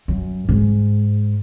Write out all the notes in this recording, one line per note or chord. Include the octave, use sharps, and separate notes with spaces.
F#2
G#2